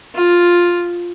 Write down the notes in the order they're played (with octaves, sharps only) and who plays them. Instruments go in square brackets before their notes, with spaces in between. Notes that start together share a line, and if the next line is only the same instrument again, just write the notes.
[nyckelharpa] F4